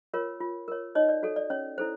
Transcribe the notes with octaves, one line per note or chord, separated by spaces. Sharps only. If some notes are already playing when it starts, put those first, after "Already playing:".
F4 A#4 C#5
F4
A#4 C#5
D#4 C#5 D#5
D5
F#4 A4 C#5
D5
C#4 C#5
E4 A4 C5